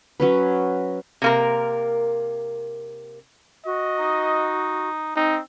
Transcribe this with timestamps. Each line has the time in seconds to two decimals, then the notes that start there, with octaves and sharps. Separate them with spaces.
0.20 F#3 C#4 B4
1.22 C3 A#3 A#4
3.65 F#4 D#5
3.99 D#4
5.16 C4 D#4